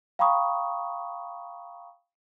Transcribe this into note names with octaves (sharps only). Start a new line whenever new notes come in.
F5 G5 A#5 B5 C#6 D#6